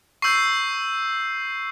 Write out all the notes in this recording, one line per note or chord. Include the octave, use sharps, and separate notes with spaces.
C#6 E6 G6 C7